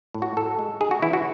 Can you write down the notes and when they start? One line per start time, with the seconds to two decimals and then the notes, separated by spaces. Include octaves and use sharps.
0.14 A2
0.22 F#4
0.37 A2 A4
0.59 G#3
0.81 D#4 G#4
0.91 F#4
1.02 E3 E4
1.13 F#4